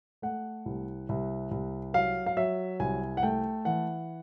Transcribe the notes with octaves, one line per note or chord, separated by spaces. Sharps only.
A3 F#5
C2
C2
C2
F#3 F5
F5
F#3 E5
C2 G#5
F#5
A3 G5
E3 F#5